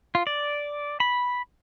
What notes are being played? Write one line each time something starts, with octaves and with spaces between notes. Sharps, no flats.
F4
D5
B5